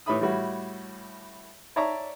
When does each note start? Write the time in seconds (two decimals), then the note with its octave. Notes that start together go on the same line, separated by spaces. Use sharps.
0.06 A2 G4 B4 E5 B5 D#6
0.21 A2 G3 E4 F#4
1.76 C#5 D5 E5 A5 A#5 C#6